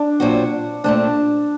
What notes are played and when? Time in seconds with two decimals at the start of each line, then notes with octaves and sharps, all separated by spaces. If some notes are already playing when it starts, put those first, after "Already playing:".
Already playing: D4
0.20 A#2 F#3 C4 F#4
0.84 A#2 A3 C4 D4